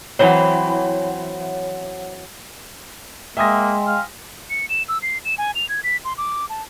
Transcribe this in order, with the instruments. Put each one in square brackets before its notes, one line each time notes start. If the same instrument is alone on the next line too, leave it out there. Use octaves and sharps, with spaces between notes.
[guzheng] E3 F#3 C4 [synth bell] C#5 F#5
[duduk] G#3 [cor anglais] A#3 [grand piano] E5 D#6 A#6 [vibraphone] G5 G#5 C6
[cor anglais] F5
[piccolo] C#7
E7
E6
C7
E7
G#5
F7
G#6
B6
C6
D6
A5